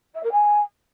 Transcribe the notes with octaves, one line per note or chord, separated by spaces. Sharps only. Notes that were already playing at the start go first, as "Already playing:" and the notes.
E5
A#4
G#5